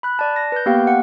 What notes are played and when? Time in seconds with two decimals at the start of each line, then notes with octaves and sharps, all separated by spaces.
0.03 B5 F#6
0.19 D5 A5
0.36 A#6
0.52 B4 G6
0.66 A#3 B3 G4 F5 G5
0.87 F#5